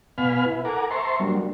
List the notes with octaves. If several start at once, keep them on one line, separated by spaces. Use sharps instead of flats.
B2 B3 F5 G#5 B5 F6
E4 B4
A4 A#4 F#5 G#5 A#5 D6
C5 E5 A5 A#5 C6 C#6
F#3 G3 A#3 D4